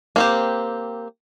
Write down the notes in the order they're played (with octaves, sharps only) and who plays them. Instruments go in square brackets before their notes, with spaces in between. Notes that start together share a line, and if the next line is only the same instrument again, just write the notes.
[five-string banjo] A#3 C4 G4